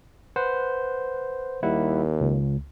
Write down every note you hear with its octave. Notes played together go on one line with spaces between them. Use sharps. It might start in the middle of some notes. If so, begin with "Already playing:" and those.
B4 C5 F#5
D#2 G3 E4 F#5
C#2